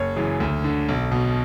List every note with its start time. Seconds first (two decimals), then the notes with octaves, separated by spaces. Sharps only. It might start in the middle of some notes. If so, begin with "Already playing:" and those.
Already playing: F#1 C#5
0.16 F#2 C#3 E3
0.40 D2
0.64 D3
0.88 B1
1.12 B2